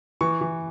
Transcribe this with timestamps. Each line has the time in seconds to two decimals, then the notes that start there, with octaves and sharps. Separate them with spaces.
0.21 E3 C#6
0.41 E3